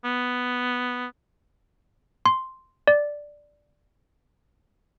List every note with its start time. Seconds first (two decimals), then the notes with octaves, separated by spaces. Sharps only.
0.05 B3
2.26 C6
2.87 D5